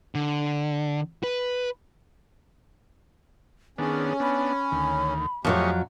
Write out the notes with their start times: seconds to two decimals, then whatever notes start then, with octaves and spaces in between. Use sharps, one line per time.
0.15 D3
1.24 B4
3.78 D#3 B3 C#4 D4 G#4
4.20 B3 D4 B5
4.72 D2 D#3
5.45 F2 D#3 F#3 A3 C#4 G4 D#5 C#6